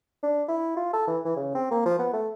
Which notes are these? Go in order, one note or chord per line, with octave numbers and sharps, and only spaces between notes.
D4
E4
F4
A4
E3
E3
C#3
C4
A#3
F3
B3
A3